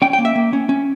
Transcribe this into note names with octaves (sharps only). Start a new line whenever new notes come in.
C#4 G5
G5
A#3
E5
A#3
C#4
C#4